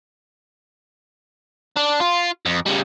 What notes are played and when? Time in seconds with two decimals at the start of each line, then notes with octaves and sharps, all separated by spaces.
1.77 D4
2.01 F4
2.46 F2
2.66 C#3 G3